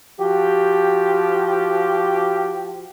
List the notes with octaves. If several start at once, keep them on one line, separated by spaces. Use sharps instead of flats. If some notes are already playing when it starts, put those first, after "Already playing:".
F3 F#4 G4